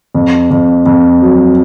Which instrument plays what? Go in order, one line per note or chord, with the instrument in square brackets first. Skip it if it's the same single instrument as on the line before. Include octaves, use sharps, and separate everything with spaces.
[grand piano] F2
F2
F2
F#3